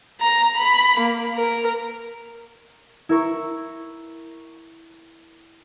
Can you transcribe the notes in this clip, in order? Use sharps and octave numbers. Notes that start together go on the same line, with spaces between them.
A#5
B5
A#3
A#4
E4 A#4 C#6